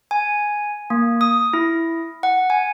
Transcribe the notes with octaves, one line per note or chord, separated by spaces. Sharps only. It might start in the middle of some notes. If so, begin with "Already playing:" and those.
G#5
A#3
D#6
E4
F#5
G#5